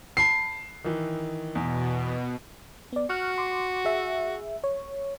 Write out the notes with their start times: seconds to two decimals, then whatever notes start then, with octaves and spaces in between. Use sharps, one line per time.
0.17 A5 B5 C7
0.84 D#3 E3
1.55 E2 B2
2.93 B3 D5
3.09 F#4 C#6 F6 F#6
3.38 C6 D6
3.85 G#4 E5
4.64 C#5